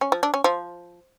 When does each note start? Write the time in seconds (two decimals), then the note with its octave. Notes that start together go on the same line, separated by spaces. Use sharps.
0.01 C#4
0.12 F3
0.23 D4
0.34 C#4
0.44 F3